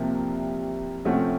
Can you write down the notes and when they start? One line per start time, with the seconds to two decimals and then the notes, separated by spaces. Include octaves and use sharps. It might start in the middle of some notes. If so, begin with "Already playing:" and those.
Already playing: C2 C3 F3 A#3
1.05 C3 F3 A3 C#4 F#4